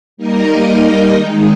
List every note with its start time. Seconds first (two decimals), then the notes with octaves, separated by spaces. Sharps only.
0.17 G3 A#3 D#4 A#4 D#5
1.12 D#3 G#3 D#4